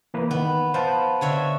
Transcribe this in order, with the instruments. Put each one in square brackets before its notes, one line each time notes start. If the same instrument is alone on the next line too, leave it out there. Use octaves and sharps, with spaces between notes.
[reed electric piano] E3 A#3 B4
[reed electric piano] D#3 [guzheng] B3
[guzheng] B3 [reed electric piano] C5 F5 A5
[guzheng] D3 C#5 E5